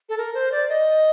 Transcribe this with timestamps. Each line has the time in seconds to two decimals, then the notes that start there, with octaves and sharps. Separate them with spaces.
0.09 A4
0.18 A#4
0.34 C5
0.52 D5
0.69 D#5